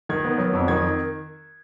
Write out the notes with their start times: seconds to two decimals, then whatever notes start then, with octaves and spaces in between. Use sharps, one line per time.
0.09 D#3 G#6
0.25 B3
0.38 F#3
0.53 F2
0.68 D#3 G#6